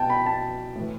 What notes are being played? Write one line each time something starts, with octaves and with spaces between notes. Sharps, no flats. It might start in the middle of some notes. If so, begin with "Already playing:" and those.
Already playing: B2 G5 A5
B5
B2 A5
A2 E3